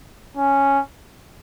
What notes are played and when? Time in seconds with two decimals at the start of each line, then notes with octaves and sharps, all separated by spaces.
0.37 C#4